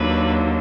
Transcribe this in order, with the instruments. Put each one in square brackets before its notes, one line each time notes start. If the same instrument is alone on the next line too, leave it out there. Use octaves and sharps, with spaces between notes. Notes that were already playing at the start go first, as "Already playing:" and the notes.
Already playing: [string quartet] D#2 D3 F#3 B4